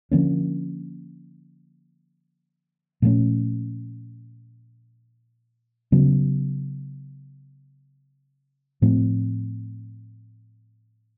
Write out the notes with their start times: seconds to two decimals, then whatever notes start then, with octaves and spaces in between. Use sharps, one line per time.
0.11 D3 F3 A#3 C#4
3.02 A#2 F3 A3 C#4
5.92 C#3 F#3 B3
8.82 A2 F3 A3 C4